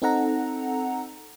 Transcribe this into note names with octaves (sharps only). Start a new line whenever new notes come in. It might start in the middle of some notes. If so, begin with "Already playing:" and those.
C4 D#4 A4 F#5 A#5